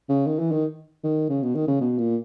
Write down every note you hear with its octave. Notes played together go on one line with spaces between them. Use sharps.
C#3
D#3
E3
D#3
D#3
C#3
B2
D#3
C#3
B2
A#2